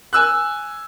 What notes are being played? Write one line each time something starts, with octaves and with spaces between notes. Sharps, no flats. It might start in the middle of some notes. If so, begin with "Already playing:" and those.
G#5 E6 F#6